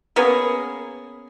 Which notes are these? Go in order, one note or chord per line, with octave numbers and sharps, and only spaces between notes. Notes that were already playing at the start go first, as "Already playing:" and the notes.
A#3 B3 C#4 G#4